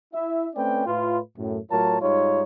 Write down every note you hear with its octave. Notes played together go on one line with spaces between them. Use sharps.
E4 E5
A3 C4 C#4 B4 D5 G5
A2 F4 B4
F#2 A2
A2 F#3 F4 A#4 C#5 A5
G#2 G3 D#4 F4 C#5